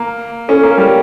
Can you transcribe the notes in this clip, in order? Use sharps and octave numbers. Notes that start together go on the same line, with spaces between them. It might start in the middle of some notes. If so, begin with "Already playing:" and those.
Already playing: A#3
C#4 A4
A#3 A4
A#4
G3